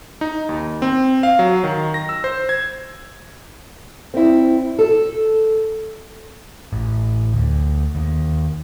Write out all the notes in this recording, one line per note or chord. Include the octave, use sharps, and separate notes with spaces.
D#4
D#2
C4
F5
F#3
D#3
A#6
E6
C5
G#6
C4 E4
A4
A1
D2
D#2